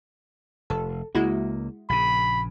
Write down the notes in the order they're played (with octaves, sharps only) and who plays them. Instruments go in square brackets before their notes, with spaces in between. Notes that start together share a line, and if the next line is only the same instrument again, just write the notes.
[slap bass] F1 [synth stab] A4
[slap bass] C#2 A#3 [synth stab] G#3 E4 F#4
[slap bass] A#1 C#3 [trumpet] B5